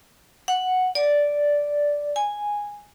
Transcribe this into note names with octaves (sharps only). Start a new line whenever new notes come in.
F#5
D5
G#5